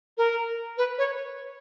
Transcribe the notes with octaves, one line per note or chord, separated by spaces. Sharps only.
A#4
B4
C#5